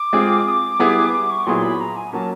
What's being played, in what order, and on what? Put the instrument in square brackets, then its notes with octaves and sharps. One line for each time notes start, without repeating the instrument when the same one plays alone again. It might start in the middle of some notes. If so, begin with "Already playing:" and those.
Already playing: [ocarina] D6
[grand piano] G#3 C4 F4 G#4
[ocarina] D#6
D6
[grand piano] G3 B3 E4 G#4
[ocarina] D6
C#6
[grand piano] A#2 F#3 B3 E4 G#4 [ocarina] C6
[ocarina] B5
A#5
G#5
[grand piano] F#3 A#3 C#4 [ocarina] A5